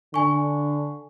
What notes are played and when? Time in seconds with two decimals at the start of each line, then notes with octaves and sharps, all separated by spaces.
0.14 D3 G#5 C#6